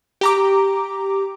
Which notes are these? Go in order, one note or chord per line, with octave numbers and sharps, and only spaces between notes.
G4 A#5 D6